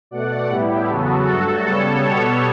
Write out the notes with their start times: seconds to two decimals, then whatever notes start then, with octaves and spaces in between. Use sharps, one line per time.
0.11 B2 A3 D5 F#5
0.49 A2 G3 B3 E4 G4
0.88 E2 C#3 F#3 B3 F#4 A4
1.26 G2 F#3 A3 F#4 A4
1.65 C#3 G3 B3 A4 C#5
2.03 B2 G3 B3 A4 C#5